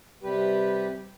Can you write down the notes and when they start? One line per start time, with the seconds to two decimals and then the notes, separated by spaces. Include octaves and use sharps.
0.23 C3 G3 G4 B4